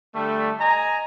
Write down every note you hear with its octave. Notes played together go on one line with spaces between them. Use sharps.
D3 G3 A3
D#5 G#5 A#5